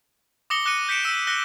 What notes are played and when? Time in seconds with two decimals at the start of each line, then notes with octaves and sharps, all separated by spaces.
0.50 D6 D#6 A#6 C#7 G7
0.65 D6 F#6 A#6 C#7 D#7
0.89 G6 B6 C#7 D7 E7
1.03 E6 B6 D#7 G7
1.27 F#6 A#6 C#7 G7